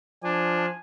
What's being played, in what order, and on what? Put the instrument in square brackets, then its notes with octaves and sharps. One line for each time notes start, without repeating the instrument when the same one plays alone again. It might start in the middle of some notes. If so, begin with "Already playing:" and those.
[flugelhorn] F3 [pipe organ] D4 [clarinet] G#5